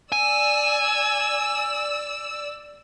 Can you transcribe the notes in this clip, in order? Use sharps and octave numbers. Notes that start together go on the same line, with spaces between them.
D5 G#5 E6